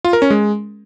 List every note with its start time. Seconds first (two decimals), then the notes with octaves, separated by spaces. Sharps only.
0.05 F4
0.13 A#4
0.22 C#4
0.30 G#3